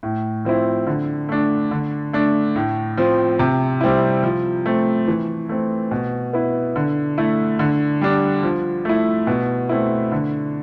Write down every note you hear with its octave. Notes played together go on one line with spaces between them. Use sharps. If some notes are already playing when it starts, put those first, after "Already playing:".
A2
F3 C4 E4
D3
A3 D4
D3
A3 D4
A2
F3 C4
C3
G3 C4 E4
F3
A3 C4
E3
A3 C4
B2
B3 E4
D3
A3 E4
D3
G3 D4
F3
A3 E4
B2
A3 C4 E4
D3